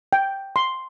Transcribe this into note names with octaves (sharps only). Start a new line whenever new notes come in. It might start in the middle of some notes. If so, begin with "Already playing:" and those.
G5
C6